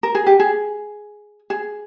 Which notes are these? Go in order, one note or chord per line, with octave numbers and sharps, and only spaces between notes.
A#4
G#4
G4
G#4
G#4